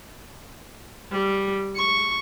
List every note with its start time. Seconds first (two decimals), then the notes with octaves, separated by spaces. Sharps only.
1.11 G3
1.76 C#6